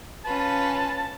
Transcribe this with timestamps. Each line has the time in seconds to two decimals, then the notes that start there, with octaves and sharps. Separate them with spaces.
0.25 C#4 F4 B4 A5